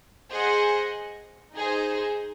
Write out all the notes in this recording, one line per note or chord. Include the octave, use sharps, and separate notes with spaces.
G#4 C5 D#5 F#5
D#4 G#4 C5